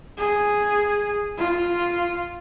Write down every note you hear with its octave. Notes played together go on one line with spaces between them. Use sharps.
G#4
F4